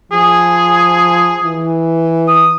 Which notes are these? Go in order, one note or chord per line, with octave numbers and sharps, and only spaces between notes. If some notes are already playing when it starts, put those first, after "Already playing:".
F3 G#4
E3
D#6